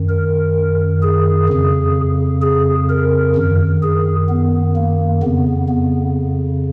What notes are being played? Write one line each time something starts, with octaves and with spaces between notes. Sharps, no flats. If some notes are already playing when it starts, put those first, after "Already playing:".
Already playing: F#2 D#3
A#4
G#4
F2 C#3
G#4
A#4
F#2 D#3
G#4
B3
A#3
F2 C#3 B3
B3